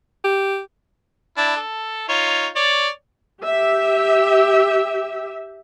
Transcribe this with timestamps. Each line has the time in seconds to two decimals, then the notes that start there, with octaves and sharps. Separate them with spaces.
0.24 G4
1.37 D4 E4
1.56 A4
2.09 D#4 F4 C#5
2.56 C#5 D5
3.42 G4 E5